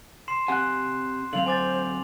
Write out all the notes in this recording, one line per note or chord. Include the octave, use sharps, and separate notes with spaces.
C6 C7 E7
C4 G4 F#5 G#5 F#6
D3 F#3 C4 F5 F7 F#7
C5 G#5 D6 A6